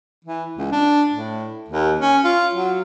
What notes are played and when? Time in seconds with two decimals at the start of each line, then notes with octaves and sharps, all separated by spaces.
0.25 E3
0.58 C#2
0.72 D4
1.11 A2
1.68 D#2
2.00 C#4
2.24 F4
2.55 F#3